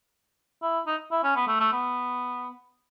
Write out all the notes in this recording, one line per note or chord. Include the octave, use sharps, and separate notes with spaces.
E4
D#4
E4
C#4
B3
A3
A3
B3